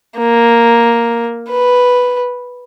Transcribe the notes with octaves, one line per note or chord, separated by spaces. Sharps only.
A#3
B4